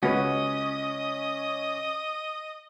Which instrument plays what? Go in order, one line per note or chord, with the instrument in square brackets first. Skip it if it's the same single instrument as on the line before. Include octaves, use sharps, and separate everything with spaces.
[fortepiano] C#2 [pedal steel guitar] C#4 [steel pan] F#4 B4 [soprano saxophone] D#5